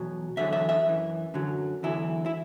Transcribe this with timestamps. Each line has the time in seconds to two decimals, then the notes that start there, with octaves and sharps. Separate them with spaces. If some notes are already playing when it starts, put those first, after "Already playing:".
Already playing: E2 B2 F#3
0.37 E2 D3 F#3 E5
0.53 E5
0.69 E5
0.86 F#2 E3
1.34 F#2 D3 F#3
1.83 E2 D3 F#3 E4
2.26 E4